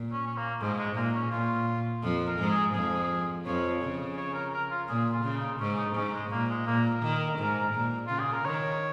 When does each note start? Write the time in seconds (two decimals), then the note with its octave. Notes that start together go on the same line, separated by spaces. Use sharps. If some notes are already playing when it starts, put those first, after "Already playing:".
Already playing: A#2
0.12 C#4
0.26 C#4
0.37 A#3
0.60 G#2 F3
0.78 G#3
0.96 A#2 A#3
1.14 C#4
1.31 A#2 F4
2.03 F2 F3
2.27 A#4
2.39 G#2 G#3
2.50 G#4
2.74 F2 F3 G#4
3.46 F2 F3 C#5
3.82 C#3
4.17 C#5
4.34 A#4
4.53 A#4
4.71 F4
4.88 A#2 G#4
5.13 F4
5.25 C#3
5.36 D#4
5.59 G#2 C#4
5.78 D#4
5.96 G#2 C#4
6.13 G#3
6.31 A#2 A#3
6.50 G#3
6.67 A#2 A#3
6.85 A#4
7.03 D#3
7.39 G#2
7.74 A#2
8.07 C#3 F4
8.19 G#4
8.32 A#4
8.45 D#3 C#5